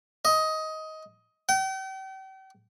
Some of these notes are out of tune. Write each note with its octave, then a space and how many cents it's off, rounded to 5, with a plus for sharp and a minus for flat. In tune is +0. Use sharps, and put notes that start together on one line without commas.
D#5 +15
G5 -40